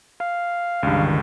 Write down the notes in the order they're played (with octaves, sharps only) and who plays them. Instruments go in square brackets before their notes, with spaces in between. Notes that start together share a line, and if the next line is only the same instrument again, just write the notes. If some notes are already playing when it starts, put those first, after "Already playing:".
[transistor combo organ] F5
[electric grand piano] C#2 G2 [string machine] D3 D#3